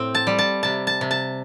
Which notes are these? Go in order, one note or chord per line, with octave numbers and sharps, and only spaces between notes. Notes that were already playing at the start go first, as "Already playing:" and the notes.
Already playing: A2 C4
A5
G3
A5
C3 A5
A5
C3
A5